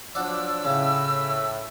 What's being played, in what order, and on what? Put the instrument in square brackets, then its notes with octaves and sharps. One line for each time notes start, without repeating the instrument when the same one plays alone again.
[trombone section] F3 F#3 D4 [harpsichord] D5 F#5 [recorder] E6
[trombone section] A2 [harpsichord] C#3